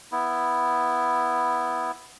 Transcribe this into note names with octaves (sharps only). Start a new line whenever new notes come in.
B3 E4